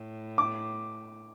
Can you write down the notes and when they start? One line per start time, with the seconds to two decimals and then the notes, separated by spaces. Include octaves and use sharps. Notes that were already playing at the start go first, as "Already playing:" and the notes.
Already playing: A2
0.38 D6